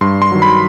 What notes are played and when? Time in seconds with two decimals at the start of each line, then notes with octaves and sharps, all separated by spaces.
0.01 G2 C6
0.22 C6
0.32 D#3 F#3
0.42 B5